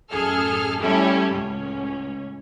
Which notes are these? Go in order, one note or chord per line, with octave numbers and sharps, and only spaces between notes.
A1 F#2 G#4 A4 F6
G3 A3 C#4 E4 G4 A4
C#2 A2 C#4